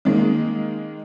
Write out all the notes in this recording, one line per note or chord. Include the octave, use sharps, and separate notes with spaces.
D#3 G#3 A#3